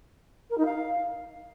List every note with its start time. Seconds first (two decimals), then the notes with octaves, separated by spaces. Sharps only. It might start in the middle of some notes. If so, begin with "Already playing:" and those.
0.50 A#4
0.57 D#4
0.65 F5